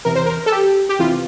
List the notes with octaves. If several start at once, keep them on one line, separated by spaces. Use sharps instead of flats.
E2 C3 E3 A#4
C5
A#4
A4
G4
G4
E2 C3 E3 F4